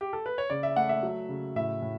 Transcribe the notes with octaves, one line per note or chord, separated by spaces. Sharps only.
G4
A4
B4
C#5
C#3 D5
E5
A3 F#5
E5
F#3
C#3
A2 E5
A2